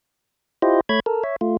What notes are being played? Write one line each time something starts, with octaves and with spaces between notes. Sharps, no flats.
E4 F4 G4 C5 D#5
A3 C#5 B5 G#6
A4 A#4
C#5 E5
A3 F4